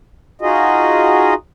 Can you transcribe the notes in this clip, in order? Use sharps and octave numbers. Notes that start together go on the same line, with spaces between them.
D#4 F4 F#4 G#4 D#5